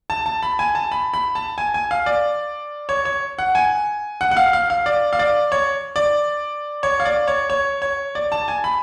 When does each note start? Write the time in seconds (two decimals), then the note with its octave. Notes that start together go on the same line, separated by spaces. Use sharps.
0.10 A5
0.26 A5
0.43 B5
0.59 G#5
0.75 A5
0.92 B5
1.14 B5
1.35 A5
1.58 G#5
1.74 G#5
1.91 F5
2.06 D5
2.89 C#5
3.05 C#5
3.39 F#5
3.55 G#5
4.21 F#5
4.31 F#5
4.37 F5
4.53 F5
4.70 F5
4.86 D5
5.13 F5
5.19 D5
5.52 C#5
5.96 D5
6.83 C#5
7.00 F5
7.05 D5
7.28 C#5
7.50 C#5
7.82 C#5
8.15 D5
8.32 A5
8.48 G#5
8.64 B5